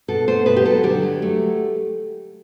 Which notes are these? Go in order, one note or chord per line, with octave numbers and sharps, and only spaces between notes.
B2 A4
A3 C5
B2 B4
G4
F#3 A4
D3 G4
F#3
A3